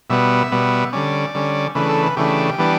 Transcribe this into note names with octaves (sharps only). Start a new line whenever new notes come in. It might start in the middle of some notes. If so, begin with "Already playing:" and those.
B2 G3 B3 E5
B2 G3 B3
D3 G3 C#4 D5
D3 G3 C#4
C#3 E3 A3 D4 B4
A4
B4
C#3 E3 A3 D4 G4
E3 G3 B3 D4